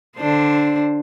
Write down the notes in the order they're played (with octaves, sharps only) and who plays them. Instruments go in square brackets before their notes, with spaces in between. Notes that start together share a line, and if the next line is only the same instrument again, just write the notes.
[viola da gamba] D3 D4 C5